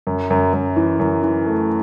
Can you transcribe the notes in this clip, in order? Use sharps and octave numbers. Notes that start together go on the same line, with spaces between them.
F#2
F#2
F#2
E3
F#2
E3
A3